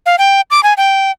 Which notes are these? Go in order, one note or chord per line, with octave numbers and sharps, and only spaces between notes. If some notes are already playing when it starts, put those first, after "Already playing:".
F5
G5
D6
G#5
G5